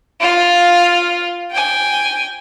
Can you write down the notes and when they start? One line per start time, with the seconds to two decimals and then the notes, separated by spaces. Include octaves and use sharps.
0.20 F4 F5
1.51 G5 G#5